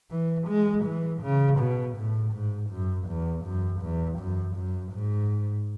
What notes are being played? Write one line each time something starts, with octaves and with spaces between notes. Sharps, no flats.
E3
G#3
E3
C#3
B2
A2
G#2
F#2
E2
F#2
E2
F#2
F#2
G#2